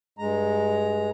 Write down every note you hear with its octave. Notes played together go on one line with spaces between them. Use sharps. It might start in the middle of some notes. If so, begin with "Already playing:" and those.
G2 G#3 A#5